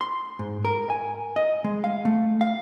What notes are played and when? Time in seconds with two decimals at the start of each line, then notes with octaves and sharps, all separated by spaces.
0.01 C6
0.39 G#2
0.65 A#4
0.90 G#5
1.36 D#5
1.64 G#3
1.84 F5
2.05 A3
2.41 F5